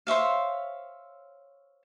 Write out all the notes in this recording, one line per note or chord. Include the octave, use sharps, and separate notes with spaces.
C5 C#5 E5 F5